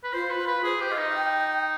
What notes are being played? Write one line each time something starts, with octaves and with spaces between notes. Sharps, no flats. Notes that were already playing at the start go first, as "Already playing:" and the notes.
B4
F4 C5
B4
F4
B4
G#4 C5
G4
F4 D#5
D#4
F5
G5